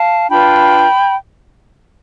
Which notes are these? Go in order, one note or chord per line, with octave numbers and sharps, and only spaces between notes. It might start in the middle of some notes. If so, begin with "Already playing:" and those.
Already playing: F5 A5
D4 F4 B4 G5 B5